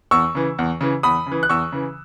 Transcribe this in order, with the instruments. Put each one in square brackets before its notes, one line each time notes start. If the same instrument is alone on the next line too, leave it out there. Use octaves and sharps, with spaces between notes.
[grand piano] E2 C#6 E6
C#3 E3
E2
C#3 E3
E2 B5 D#6
C#3
E3
F#6
E2 C#6 E6
C#3 E3